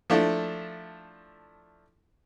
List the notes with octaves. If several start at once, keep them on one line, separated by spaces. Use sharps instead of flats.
F3 A3 D4 E4 A4